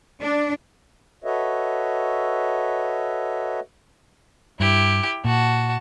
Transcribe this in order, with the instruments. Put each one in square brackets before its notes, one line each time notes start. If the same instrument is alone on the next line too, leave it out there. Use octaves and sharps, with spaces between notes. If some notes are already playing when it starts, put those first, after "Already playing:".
[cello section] D4
[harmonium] F#4 A4 B4 C#5 D#5 E5
[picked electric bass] G2 [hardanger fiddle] E4 G4
[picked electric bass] A#2 [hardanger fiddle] F#4 A5